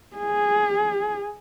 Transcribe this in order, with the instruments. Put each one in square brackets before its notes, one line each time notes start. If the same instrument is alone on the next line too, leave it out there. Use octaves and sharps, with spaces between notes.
[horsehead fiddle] G#4